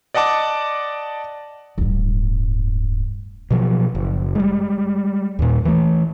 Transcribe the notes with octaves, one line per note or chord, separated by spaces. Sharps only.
D5 D#5 F#5 A5 D6
D1 G2
B2 F3 F#3
F#1
G3 G#3
D#2 A#2
E3 A3